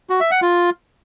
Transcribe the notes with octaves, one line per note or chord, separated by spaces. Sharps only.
F#4
E5
F#5
F4